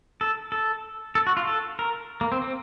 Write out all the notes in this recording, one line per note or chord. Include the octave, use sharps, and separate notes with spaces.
A4
A4
A4
F#4
F4
A4
A#4
A#3
C4
C4